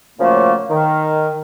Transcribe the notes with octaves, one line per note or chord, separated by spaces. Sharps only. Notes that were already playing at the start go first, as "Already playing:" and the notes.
A#2 C#3 F3 F#3 A3 A#3
D#3